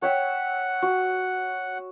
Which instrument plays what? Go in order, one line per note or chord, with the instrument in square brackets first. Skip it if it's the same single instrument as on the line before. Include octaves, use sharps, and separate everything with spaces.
[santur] C#5 E5 G5 [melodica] F#5
[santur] F#4